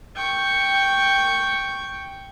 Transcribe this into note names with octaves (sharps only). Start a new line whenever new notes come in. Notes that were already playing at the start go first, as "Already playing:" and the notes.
G5 C#6